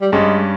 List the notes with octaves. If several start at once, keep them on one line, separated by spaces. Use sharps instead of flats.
G3
G2 G3 G#3 C#4